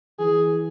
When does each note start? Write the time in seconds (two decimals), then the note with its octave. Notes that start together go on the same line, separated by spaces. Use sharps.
0.19 E3 G#4